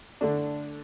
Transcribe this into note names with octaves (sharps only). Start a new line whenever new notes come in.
D3 A3 D4